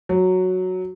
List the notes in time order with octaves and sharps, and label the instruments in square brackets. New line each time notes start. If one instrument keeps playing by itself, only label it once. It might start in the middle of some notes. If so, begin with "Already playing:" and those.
[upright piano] F#3